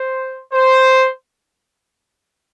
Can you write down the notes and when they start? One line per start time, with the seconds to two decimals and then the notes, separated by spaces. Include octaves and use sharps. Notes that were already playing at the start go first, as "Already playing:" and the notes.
Already playing: C5
0.53 C5